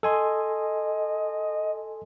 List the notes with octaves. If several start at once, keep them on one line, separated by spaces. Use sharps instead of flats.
A4 D#5 G#5 C6